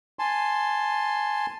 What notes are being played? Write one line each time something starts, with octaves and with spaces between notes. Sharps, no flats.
G#5 A5 C6